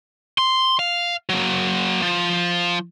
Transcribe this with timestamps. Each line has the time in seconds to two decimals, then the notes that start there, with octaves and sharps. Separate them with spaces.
0.38 C6
0.79 F5
1.29 F#3 A#3
2.02 F3